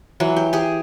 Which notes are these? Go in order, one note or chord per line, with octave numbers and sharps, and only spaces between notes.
E3 F#3
G4
G4 G#4